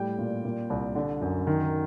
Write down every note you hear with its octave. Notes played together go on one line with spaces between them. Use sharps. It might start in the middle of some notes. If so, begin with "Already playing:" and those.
Already playing: A2 G3 G5
A#2
A#2
C2
D3
F#2
D#3